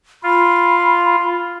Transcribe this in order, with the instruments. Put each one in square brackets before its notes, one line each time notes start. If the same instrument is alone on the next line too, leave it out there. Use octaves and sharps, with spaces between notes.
[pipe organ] F4 [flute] B5